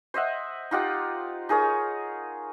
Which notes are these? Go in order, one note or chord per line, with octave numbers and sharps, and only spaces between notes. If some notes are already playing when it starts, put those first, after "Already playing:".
C5 D#5 E5 F#5
D#4 F4 G4 F#5
D#4 G#4 A#4 C#5